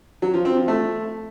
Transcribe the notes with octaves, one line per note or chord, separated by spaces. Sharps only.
F#3
F3
C4
F3
A3